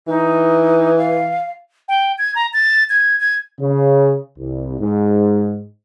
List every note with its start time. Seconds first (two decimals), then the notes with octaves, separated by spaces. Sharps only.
0.07 E3 D#4
0.97 F5
1.88 G5
2.18 G#6
2.35 A#5
2.53 A6
2.90 G#6
3.20 G#6
3.60 C#3
4.38 C2
4.80 G#2